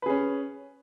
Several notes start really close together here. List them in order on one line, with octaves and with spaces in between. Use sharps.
B4 G#4 C#4